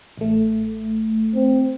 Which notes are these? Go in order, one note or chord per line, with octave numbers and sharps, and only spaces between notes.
A1 A3
C4